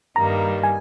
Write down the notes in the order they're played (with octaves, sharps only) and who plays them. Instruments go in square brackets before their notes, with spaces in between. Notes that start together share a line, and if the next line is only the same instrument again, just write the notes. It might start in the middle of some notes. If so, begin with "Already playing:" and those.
[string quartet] G2 D#3 G3 A#3 [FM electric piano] A#5
[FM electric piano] G#5